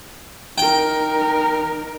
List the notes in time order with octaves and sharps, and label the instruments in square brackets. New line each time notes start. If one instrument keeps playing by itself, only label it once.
[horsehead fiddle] D#4 A#4 [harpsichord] G5